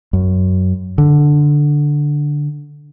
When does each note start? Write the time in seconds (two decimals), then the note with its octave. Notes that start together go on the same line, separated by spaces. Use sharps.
0.13 F#2
0.98 D3